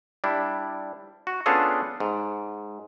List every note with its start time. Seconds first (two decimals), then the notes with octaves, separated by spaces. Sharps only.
0.24 G3 D4 E4
1.27 F#4
1.46 B3 C#4 D4 F4 G#4 A4
2.00 G#2